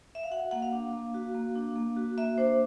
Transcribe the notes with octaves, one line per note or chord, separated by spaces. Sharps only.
E5
F5
F#4 F#5
A#3 F#5
F5
D4
A#3
F#4
A#3
D4
A#3
F#4
A#3 E5
D4 C5